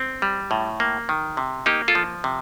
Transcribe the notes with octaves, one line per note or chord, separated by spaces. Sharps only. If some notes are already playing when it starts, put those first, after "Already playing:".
Already playing: C4
G3
A2
A#3
D#3
C3
A#3 D#4 G4
F4 A4
F3
C3